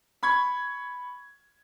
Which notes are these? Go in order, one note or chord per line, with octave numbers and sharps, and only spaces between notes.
B5 C#6 G#6